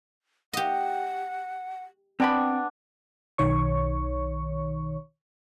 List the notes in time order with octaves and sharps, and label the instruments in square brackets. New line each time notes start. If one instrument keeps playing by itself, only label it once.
[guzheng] G4 D#5 [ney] F#5
[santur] B3 D4 G#5 [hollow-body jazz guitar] C4 G5 B5
[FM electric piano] B1 D#3 C#5 C#6